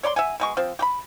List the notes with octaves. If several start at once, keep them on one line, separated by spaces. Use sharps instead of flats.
C#5 D5 B5 C6
E5 F#5 G#5
B2 G#3 C#6
F3 C4
G4 B5